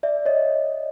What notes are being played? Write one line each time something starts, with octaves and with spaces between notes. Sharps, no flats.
D5 E5
C#5 D#5